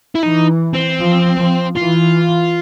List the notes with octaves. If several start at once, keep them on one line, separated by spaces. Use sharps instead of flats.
E4
E3 D#4
C4
F3
F3
E3 F4